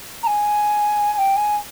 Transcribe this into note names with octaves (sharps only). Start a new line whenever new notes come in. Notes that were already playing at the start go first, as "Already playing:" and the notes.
A#5
G#5
G#5
G5
G#5